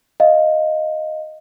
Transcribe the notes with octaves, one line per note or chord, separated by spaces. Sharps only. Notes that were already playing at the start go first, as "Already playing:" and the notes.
D#5 F5